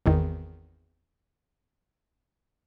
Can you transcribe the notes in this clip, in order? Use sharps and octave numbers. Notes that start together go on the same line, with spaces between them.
G#1 E2 D#3